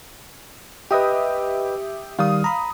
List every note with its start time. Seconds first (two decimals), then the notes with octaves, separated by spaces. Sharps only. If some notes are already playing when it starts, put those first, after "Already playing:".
0.91 G4 B4 D#5 E5 G5 D#6
2.19 D#3 G3 F5 D#6
2.44 A#5 B5